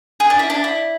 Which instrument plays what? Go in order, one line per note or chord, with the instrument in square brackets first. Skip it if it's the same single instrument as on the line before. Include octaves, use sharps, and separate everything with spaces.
[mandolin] G#4
D4
E4
D4
E4